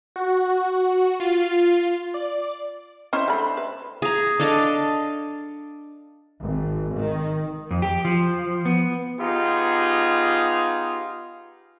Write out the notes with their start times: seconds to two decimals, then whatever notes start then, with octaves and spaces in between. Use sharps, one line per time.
0.16 F#4
1.20 F4
2.14 D5
3.13 C#4 D#4 E4 C5 E5 C6
3.28 D3 A3 B5
3.57 B4
4.02 G#4 A#5
4.40 D4 A4 D#5 F5
6.42 G#1
6.98 D#3
7.70 F2
7.82 G4
8.05 F3
8.65 B3
9.20 B3 D#4 F4 G4 G#4